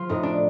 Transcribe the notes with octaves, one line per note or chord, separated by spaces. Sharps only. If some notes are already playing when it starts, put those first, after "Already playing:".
Already playing: F3 F4
A2 D#4
D4